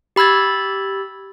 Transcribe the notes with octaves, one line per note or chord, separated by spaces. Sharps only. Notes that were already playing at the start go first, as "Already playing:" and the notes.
G4 B5 E6 G#6 A6